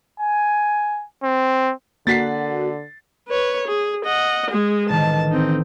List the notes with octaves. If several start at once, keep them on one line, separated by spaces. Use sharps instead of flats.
G#5
C4
D3 A#3 F#4 F#5 A6 B6 C7
B4 C#5
G#4
D#5 F#5
G#3 G#4
A1 D3 D#3 A5
C4 D#4